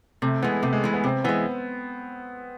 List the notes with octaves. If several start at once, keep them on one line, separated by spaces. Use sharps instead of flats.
C3 A3
E3 G#3 B3
C3 A3
G#3
E3 G#3
B3
C3 C4
E3 G#3 B3